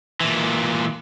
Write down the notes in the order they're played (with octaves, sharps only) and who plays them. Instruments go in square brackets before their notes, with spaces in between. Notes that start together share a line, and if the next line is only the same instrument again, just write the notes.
[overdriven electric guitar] A#2 E3